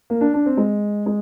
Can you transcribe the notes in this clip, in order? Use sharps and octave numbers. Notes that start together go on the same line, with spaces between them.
A#3
D4
D4
C4
G#3
G#3